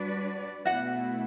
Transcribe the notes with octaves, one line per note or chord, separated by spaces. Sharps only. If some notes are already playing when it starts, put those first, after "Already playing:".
Already playing: G3 D4 F#4 B4 D5
B2 A3 E4 F#4 F#5